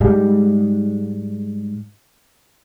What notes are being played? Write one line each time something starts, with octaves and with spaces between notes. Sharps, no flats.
G#2 G3 G#3